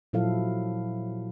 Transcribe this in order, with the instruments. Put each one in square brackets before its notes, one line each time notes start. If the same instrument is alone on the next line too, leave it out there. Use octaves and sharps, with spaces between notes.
[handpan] A#2 F3 F#3 E4 A4 F5